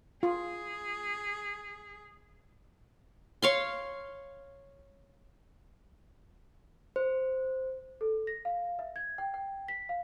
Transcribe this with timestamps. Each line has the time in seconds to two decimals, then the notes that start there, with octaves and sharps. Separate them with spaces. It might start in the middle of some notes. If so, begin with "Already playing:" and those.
0.23 F4 G#4
3.42 C#5 F5 C6
6.96 C5
8.01 A4
8.27 A#6
8.45 F5
8.79 E5
8.96 G#6
9.18 G5
9.34 G5
9.68 B6
9.89 F5